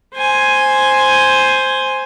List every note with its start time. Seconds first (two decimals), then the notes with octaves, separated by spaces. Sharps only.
0.15 C5 G#5